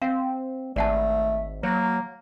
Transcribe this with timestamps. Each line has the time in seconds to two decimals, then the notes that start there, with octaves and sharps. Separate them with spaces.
0.02 C4 F5
0.76 G#1 A3 D5 F#5 A5
1.63 F#3 A#3 C#5